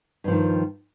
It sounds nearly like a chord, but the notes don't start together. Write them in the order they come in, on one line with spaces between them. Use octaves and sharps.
G2 F3 D#3